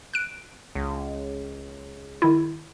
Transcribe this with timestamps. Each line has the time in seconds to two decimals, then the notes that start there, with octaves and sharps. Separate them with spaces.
0.13 F#6 D7
0.75 C#2
2.22 D#3 E4